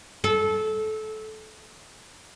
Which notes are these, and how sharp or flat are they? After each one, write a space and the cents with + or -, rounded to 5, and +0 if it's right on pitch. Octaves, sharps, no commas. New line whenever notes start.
A4 -20